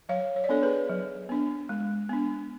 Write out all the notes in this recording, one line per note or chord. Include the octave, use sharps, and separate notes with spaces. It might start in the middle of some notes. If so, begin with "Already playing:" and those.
F#3 C#5 F5
C#5
D5
B3 D4 A4 C#5
G#4 B4
F#3
B3 D4
G#3
B3 D4